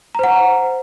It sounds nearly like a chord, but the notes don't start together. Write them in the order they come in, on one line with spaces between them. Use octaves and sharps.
A#5 C5 F#5